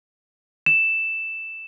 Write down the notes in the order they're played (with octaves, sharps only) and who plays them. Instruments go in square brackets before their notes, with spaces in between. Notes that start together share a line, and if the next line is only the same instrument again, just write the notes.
[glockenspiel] E7